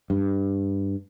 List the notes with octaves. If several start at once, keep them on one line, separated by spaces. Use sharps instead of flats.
G2